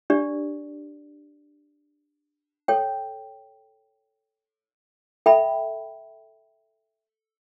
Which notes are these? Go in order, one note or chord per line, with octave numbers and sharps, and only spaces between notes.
D4 G4 D5
A4 C#5 G5
A4 E5 G5 B5